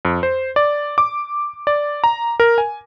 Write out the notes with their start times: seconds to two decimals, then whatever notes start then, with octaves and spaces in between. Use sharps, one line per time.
0.05 F2
0.23 C5
0.56 D5
0.98 D6
1.67 D5
2.04 A#5
2.40 A#4
2.58 G#5